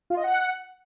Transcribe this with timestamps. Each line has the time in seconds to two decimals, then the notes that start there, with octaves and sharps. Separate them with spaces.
0.10 F4
0.17 D#5
0.24 F#5